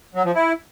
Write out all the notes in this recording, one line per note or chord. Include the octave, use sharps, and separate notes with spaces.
F#3
F3
E4